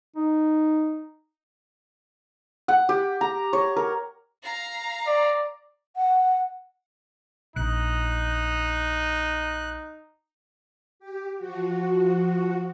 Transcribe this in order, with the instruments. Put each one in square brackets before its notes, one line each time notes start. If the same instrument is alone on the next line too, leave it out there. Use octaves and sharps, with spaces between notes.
[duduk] D#4
[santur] F#5
G4
A#5
C#5
A#4
[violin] F5 A#5
[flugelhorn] D5
[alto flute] F#5
[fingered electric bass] A#1 [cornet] D#4 [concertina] F#6
[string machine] G4
F3 F#4